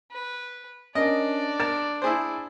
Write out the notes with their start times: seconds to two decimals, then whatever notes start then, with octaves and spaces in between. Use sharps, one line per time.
0.12 B4
0.95 C#4 D4 A#4 D5 D#5
1.60 A#4 A6 E7
2.02 E4 G#4 C5